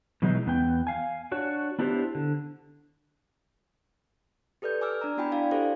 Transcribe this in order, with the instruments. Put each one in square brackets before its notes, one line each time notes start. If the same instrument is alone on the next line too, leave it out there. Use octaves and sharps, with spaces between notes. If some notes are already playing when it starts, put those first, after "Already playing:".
[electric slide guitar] B2 E3 F#3 G#3 D#4
E2 B3 G5
F5 G#5
D4 F#4 C#5
B3 D4 E4 G4 B4 C5
D3
[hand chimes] G4 A4 B4 D5 G6
G#5 D6 E6 F6
D4 D5 A#5
B3 E4 F#4 G5 G#5 B5
D4 E4 D5 F5 G#5
G4 A4 C5 D5 F5